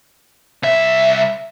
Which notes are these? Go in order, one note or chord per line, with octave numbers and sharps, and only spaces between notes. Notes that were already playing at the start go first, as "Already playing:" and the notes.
C2 E5